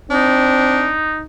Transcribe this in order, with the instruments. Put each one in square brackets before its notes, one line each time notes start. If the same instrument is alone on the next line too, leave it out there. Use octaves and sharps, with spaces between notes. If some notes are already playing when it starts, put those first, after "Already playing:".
[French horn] C4 [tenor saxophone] D4 [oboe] D#4